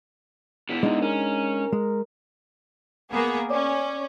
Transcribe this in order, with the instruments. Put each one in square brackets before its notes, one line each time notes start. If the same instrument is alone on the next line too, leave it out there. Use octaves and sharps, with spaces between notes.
[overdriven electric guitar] B2 E3 [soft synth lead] B6
[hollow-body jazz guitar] G#3 D4 D#4 [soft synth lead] D#5
[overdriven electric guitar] C#4 [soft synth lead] A#4
[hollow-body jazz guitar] G#3
[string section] A#3 B3 G#4
[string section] C#4 [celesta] C#5 D5 D6